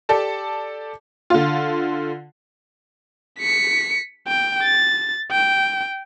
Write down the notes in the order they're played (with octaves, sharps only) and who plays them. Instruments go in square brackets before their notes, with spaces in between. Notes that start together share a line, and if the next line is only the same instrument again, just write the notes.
[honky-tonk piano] G4 A4 D5 A5
D3 F4
[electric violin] B6 C#7
G5
A6
G5